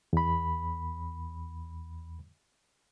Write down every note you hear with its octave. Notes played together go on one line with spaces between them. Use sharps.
E2 B5